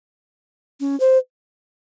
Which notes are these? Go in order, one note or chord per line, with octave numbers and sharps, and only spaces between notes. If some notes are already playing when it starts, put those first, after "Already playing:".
C#4
C5